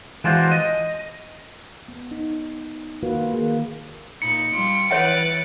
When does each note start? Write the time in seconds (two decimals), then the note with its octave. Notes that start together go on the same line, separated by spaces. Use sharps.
0.24 E3 G#3 D4 F4 F#4 C5
0.51 D#5
1.88 B3
2.11 D#4
3.03 D#3 A#3 F4 F#4 B4
3.33 D#3 A#3 G#4
4.22 A#2 D#4 B5 C#7
4.52 G3 F4 D7
4.91 E3 B4 C#5 E5 F#5 A6 D7